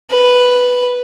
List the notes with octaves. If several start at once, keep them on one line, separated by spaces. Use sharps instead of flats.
B4